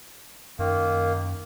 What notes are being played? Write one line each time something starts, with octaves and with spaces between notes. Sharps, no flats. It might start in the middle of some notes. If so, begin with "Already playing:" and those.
F#2 D#3 A#3